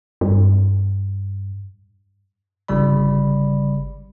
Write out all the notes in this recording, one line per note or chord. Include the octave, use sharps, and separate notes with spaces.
G2
G1 C#3 G3 D5 B5